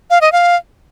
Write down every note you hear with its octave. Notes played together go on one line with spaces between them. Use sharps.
F5
D#5
F5